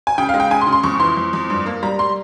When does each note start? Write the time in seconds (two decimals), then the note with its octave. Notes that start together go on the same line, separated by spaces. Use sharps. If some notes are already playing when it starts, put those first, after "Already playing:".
0.07 G#5
0.18 C#3 G5
0.29 F5
0.34 G#3
0.40 G5
0.50 C#3 G#5
0.61 C6
0.67 C#3
0.73 C6
0.84 F2 C#6
1.00 E3 C6
1.17 F2
1.33 F2
1.50 G2
1.66 A#3
1.83 G3 A#5
1.99 G3 C6